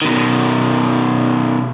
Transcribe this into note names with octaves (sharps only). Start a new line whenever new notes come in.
B2 D#3